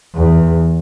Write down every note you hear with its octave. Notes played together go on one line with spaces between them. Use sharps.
E2